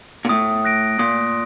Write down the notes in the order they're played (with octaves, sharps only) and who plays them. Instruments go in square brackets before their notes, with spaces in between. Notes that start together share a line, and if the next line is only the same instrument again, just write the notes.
[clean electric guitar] A#2
[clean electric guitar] A2 [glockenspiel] D#6
[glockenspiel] F#6 A#6 D7
[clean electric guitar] A#2 [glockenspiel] D#6